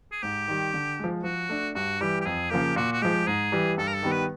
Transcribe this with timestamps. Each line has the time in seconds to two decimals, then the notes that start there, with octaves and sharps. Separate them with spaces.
0.12 G#4
0.23 G#2 G4
0.48 D#3 G3
0.73 D3
0.99 F3 G#3
1.24 F3 F#4
1.49 A3 D4
1.75 G2 F#4
2.01 E3 G3 G4
2.21 G4
2.25 F2 G#4
2.50 C#3 F3 A#3 G4
2.76 A#2 F#4
2.93 F#4
3.02 F3 G#3 G4
3.27 G#2 G#4
3.52 E3 G3
3.78 G2 A4
3.88 A#4
3.95 A4
4.03 D#3 G3 B3
4.12 B4